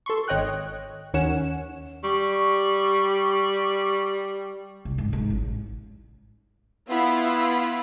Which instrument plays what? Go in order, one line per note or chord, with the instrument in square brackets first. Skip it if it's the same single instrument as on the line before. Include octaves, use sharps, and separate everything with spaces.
[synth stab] A4 C6 C#6
G#1 C#5 D#5 G5 F#6
D#2 D#3 C#4 C#5 F#5 E7
[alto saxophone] G3 [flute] C#6
[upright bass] C2
G#2
G#2
A1
[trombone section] B3 [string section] E4 F4 B5